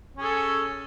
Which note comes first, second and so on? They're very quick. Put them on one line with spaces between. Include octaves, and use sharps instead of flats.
C#4 G#4 A4